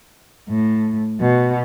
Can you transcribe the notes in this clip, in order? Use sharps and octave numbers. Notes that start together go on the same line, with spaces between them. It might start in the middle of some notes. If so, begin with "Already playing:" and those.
A2
B2